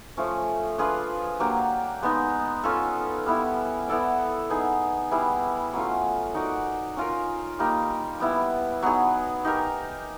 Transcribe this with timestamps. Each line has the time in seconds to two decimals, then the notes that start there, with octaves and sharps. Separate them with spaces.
0.17 F3 A3 C#4
0.78 D4 F4 G#4 B4
1.40 F#3 A#3 D4 G4
2.02 G#3 B3 D#4
2.64 C#4 F4 A4
3.26 G3 B3 E4
3.88 B3 E4 A4 D5
4.49 B3 D#4 G#4
5.11 G3 B3 E4 G#4
5.73 F#3 A3 C#4 F4
6.35 D#4 F#4 A#4 D5
6.96 C#4 F4 A#4
7.59 G3 A#3 D#4 G4
8.20 G3 B3 E4
8.83 F#3 B3 D#4 G#4
9.45 D#4 G4 A#4